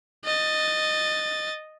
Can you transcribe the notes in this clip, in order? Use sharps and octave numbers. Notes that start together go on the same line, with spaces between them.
D#5 A6